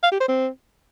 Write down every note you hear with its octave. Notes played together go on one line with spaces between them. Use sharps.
F5
G4
C5
C4